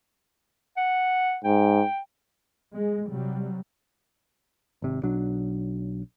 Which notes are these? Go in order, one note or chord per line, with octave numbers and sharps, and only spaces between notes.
F#5
G#2 G5
G#3
C3 F#3 G3
G#1 C3
B1 F#3 D4